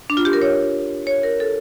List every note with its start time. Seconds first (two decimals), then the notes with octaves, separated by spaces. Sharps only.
0.10 D4
0.17 F4
0.25 G4
0.33 A#4
0.42 C#5
1.07 C#5
1.23 A#4
1.40 A4